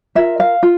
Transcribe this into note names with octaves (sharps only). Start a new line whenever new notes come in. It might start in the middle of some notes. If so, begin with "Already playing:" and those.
F4 A#4 E5
F5
F4